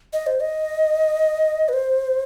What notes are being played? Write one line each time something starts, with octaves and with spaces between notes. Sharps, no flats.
D#5
C5
D#5
B4
C5